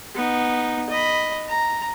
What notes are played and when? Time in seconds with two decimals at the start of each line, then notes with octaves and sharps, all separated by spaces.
0.15 B3 D#4
0.90 D#5 B5
1.48 A#5